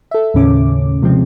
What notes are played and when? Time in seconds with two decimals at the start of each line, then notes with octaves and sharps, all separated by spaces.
0.11 A4 E5
0.34 D#2 A2 C#3 C#4 D6
1.03 C3 F3 G#3 C4